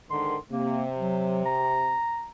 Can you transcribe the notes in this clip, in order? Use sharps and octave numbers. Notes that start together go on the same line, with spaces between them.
G#2 D3 D#3 C6
C3 A#3
F#3
A#5